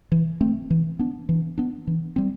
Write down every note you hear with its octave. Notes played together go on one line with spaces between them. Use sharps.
E3
A3 C4
E3
B3 D4
E3
B3 D4
E3
G3 C4